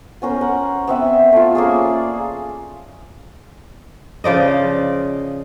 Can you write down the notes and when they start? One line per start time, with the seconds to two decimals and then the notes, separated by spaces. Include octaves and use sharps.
0.22 B3 C#4 A#4 C5
0.41 A#4 F#5
0.87 B3 C4 E5
1.32 A3 F4
1.55 A#3 C#4 G#4
1.85 D5
4.24 C#3 F3 D5 D#5